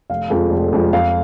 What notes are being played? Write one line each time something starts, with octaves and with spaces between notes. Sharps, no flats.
F1 F5
F2 F3 G#3
F1
F2 F3 G#3
F2 F5